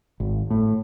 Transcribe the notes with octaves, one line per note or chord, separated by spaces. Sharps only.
G#1
A2